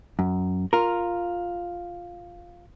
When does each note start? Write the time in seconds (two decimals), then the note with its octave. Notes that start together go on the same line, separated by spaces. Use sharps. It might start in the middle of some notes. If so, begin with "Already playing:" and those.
0.19 F#2
0.73 F4 A#4